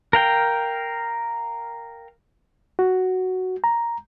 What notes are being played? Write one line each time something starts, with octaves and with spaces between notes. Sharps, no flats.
A#4 F5 G5
F#4
A#5